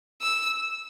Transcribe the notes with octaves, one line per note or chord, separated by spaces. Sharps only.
E6